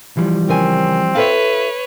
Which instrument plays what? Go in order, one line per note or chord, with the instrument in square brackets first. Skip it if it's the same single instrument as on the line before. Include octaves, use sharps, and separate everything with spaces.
[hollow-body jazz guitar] E3 F3 G3
[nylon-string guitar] C#3 A#4 G#5 [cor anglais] C4
[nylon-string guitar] F4 A4 E5 [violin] B4 C#5 [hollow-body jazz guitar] F5